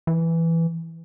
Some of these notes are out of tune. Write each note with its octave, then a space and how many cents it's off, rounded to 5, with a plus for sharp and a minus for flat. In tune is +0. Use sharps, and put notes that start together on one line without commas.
E3 +5